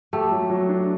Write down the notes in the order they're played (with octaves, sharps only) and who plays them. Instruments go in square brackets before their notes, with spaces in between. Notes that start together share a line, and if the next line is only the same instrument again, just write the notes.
[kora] A3 [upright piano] G4
[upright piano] F#3
F#3
D4